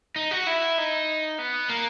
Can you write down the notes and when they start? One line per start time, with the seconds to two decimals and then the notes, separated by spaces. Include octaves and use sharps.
0.16 D#4
0.31 F#4
0.47 E4
0.78 D#4
1.38 B3
1.69 A#3